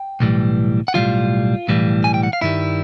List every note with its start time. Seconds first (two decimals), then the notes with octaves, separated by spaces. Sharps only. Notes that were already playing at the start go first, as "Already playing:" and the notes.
Already playing: G5
0.20 B1 A2 E3 G3
0.88 F#5
0.94 B1 A2 E3 G3 F4 F5
1.68 B1 A2 E3 G3
2.04 G#5
2.14 G5
2.23 F#5
2.33 F5
2.41 G2 D#3 G3 E4 E5